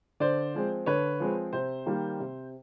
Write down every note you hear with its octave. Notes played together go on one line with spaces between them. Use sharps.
D3 C5 D5
F3 G#3 C4
D3 B4 C#5
F3 G#3 C4
C3 C5
D#3 G3 A#3
C3